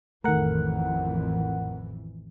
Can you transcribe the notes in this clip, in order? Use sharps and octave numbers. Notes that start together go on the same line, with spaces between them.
A1 F2 D#3 E3 A3 A#4 F#5